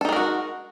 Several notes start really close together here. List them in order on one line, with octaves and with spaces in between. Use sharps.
A4 D#4 G#3 A#4 F#4